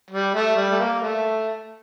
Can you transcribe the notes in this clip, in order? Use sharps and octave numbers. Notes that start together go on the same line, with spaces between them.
G3
A3
G3
A3
A#3
A3